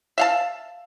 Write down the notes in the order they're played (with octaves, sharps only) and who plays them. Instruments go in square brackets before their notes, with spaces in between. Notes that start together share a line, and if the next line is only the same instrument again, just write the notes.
[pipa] E5 F5 A5